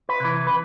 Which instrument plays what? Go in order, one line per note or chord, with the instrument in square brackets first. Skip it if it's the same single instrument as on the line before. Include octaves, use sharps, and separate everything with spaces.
[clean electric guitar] B4
C3 E3
B4